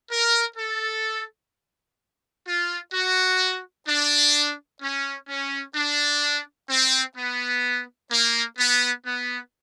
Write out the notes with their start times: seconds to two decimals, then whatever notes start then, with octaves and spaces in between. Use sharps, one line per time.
0.11 A#4
0.57 A4
2.46 F4
2.93 F#4
3.87 D4
4.81 C#4
5.29 C#4
5.75 D4
6.69 C4
7.16 B3
8.10 A#3
8.58 B3
9.05 B3